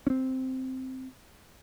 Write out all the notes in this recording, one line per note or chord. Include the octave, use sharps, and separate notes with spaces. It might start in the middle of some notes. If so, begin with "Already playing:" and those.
C4 C#4